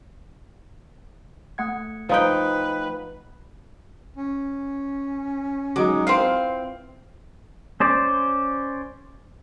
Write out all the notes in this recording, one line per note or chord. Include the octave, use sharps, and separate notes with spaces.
A3 F#5 G#6
F3 D#4 B4 G5
C#4
F#3 G#3 D#4 D6
E3 C4 F4 F5 C7
C#4 C5 D5